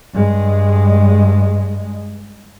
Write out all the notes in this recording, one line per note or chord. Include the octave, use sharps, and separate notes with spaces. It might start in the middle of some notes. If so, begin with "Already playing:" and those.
G2 G#3